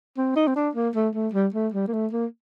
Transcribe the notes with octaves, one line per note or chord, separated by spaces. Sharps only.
C4
D#4
C4
D4
A#3
A3
A3
G3
A3
G3
A#3
A3
A#3